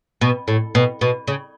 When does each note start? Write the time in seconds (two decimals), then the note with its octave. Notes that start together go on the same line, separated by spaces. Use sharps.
0.21 B2
0.48 A2
0.75 B2
1.01 B2
1.27 C#3